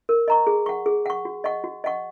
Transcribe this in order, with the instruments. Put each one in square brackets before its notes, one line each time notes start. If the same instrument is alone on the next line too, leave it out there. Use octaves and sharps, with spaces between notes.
[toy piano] A#4
D#5 A#5 C#6
G#4
F#5 C#6
G#4
F#5 C#6
F#4
D#5 F#5 C#6
F#4
D#5 F#5 C#6